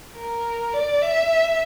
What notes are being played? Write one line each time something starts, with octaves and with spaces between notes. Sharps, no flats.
A#4
D5
E5